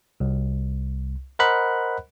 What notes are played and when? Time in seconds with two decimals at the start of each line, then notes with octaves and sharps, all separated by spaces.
0.20 C2
1.39 A#4 C5 D#5 F#5 B5 F#6